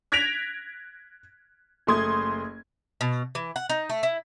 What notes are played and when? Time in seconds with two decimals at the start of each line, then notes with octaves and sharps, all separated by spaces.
0.12 F#6 G#6 A#6 B6 D7 F7
1.87 F#1 A3 C6 D#6 G#6
3.01 B2
3.35 E3
3.56 F#5
3.70 D#4
3.89 A3
4.03 E4